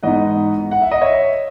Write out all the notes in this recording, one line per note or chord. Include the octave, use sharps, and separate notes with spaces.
G#2 E3 B3 D#4 D#5 F#5
F#5
E5
D#5
C#5 E5